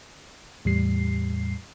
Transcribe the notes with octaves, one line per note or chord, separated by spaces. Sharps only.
E2 A2 G3 C7